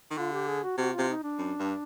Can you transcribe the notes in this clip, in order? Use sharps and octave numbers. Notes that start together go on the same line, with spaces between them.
D#3
D3 F4
G4
G#4
F#4
C3 F#4
C3 F4
D#4
D4
F#2
G2